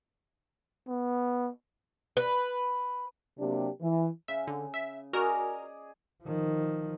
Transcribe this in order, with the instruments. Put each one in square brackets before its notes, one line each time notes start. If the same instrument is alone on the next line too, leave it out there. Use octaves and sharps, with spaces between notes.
[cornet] B3
[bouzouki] B4
[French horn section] C3 F#3 A#3 D4 G4
E3
[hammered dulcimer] C#3 [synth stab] E5
[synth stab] D3
E5
[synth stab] F#4 A#4 A#5 [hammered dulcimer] G#4 D5 D#5
[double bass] D#3 F3